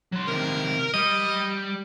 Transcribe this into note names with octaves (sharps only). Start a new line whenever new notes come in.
F#3 C6
C3 D#3 A#4
G3 D#5